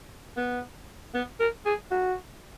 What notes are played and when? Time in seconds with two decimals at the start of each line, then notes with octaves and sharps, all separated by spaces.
0.37 B3
1.14 B3
1.40 A#4
1.66 G#4
1.91 F#4